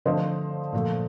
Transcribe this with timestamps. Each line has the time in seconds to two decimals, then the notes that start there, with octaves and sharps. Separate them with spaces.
0.06 D3 F3 A3 C5 D#5
0.73 A#2 F3 A3